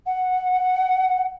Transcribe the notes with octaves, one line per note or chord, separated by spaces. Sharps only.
F#5